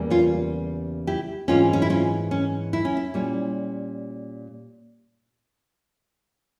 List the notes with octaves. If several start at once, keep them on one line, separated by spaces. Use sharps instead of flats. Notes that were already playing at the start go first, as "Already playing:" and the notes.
Already playing: E2 C#3 G3 A#3
C#4 F4
E4 G4
G#2 E3 G#3 C4 C#4 F4
C#4
E4
C#4 F4
C#4
E4
C#4
E4
A#2 G3 C#4